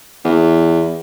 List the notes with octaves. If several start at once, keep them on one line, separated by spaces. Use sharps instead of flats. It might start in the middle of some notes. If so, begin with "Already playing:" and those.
E2